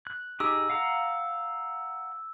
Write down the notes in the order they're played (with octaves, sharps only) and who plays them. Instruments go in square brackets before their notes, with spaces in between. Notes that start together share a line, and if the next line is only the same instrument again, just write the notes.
[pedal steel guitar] F#6
[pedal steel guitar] D#4 G4 G#4 [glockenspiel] E6
[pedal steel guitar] F5 F#5 A#5